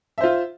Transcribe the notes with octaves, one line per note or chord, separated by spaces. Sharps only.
F4 C5 E5